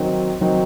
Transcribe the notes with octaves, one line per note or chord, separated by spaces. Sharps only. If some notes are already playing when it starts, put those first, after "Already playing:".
Already playing: D#3 F#3 C4 D#4
D#3 F#3 C4 D#4